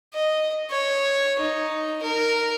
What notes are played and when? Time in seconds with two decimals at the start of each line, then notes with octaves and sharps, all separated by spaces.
0.14 D#5
0.70 C#5
1.40 D#4
2.02 A#4